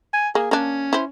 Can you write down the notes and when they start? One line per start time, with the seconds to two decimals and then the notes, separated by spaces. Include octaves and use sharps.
0.13 G#5
0.35 A#3 G#4
0.51 A#3 C#4 D4
0.93 E4 C5